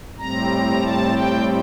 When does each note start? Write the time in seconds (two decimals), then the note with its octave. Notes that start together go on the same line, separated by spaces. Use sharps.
0.17 A2 G3 C4 A#5
0.81 A5
1.12 G5